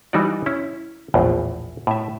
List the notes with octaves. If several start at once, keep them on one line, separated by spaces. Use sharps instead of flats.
E3 G3 D#4 F#4 D5
C#4 E4
A#1 E2 A2
A2 E5